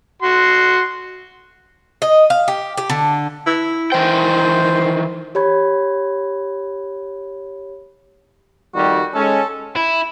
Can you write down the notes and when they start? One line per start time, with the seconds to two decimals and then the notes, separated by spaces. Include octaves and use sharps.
0.22 F#4 C6
2.02 D#5
2.30 F5
2.48 G4
2.77 G4
2.90 D3
3.47 E4
3.92 D#3 E3 C5 G5
5.35 G4 C#5 B5 G#6
8.75 F2 D#3 G3 F#4
9.14 G#3 C#4 A4
9.76 E4